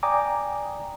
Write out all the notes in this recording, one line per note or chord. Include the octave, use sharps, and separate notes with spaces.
D5 G5 G#5 A#5 D6 D#6